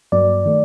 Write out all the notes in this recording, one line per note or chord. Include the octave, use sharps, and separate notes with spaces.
G2 F#3 A#3 D5
D#3 A3